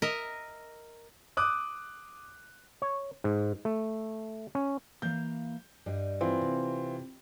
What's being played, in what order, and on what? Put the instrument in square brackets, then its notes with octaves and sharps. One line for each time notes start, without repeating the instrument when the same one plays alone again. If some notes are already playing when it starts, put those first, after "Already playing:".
[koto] A#4 D#5 E5
[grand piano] D6 D#6 F#6
[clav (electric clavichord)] C#5
G#2
A3
C#4
[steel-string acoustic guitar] E3 A#3 F5 [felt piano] G6
[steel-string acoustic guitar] G2 G3 D#5
[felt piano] E3 C4 F4
[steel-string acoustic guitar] C3